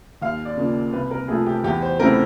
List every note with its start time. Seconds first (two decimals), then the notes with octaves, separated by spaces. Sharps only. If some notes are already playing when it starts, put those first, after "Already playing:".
0.22 D#2 F5
0.45 D5
0.57 C#3 F3 A#3
0.93 C2 B4
1.11 A#4
1.28 C3 F3 A3 G#4
1.46 G4
1.64 E2 G4
1.82 C5
2.00 C#3 E3 A3 C4 A#4